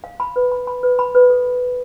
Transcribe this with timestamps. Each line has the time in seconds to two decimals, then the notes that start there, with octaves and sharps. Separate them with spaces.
0.04 F5
0.20 B5
0.36 B4
0.52 B5
0.67 B5
0.83 B4
0.99 B5
1.15 B4
1.30 A4